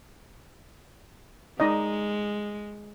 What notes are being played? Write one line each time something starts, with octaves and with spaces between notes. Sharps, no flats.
G#3 D#4 D5 D#5